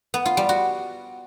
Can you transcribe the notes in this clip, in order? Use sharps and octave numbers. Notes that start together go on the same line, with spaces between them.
B3
F4
G3
F#4